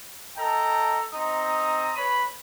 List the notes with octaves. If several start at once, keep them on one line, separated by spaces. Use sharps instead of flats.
A4 D#5 G5 A5 A#5
C4 D#4 A#5 D#6
B4 C#5 B5